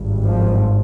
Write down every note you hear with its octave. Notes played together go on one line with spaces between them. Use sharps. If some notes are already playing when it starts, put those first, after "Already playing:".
Already playing: G#1 G2
F3